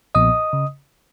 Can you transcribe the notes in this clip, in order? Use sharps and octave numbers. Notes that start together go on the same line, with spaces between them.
B1 A#2 F3 B3 D#5 D#6
C#3